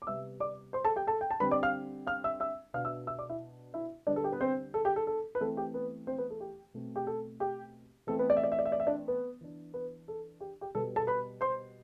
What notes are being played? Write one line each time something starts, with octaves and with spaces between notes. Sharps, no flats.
D6
C3 G3 B3 E5 E6
D5 D6
C5 C6
A4 A5
G4 G5
A4 A5
G5
A5
D3 G3 C4 B4 B5
D5 D6
F5 F6
F5 F6
E5 E6
E5 E6
B2 B3 D4 F5 F6
E5 E6
E5 E6
D5 D6
E4 E5
E4 E5
D3 G3 B3 D4 D5
A4
G4
B3 B4
C4 C5
A4
G4
A4
A4
B4
E3 A3 C4 A4
G4
B3 B4
C4 C5
B3 B4
A4
G4
B2 A3 C4
G4
A4
G4
E3 A3 C4 A4
B3 B4
D5
E5
D5
E5
D5
E5
D5
E5
D4 D5
B3 B4
E3 B3 D4
B3 B4
A4
G4
G4
B2 G3 B3 A4
A4 A5
B4 B5
C5 C6